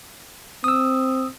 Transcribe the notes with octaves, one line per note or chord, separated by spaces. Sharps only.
C4 D#6 E6